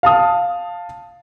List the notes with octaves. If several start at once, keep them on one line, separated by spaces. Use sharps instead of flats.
F5 A5 D#6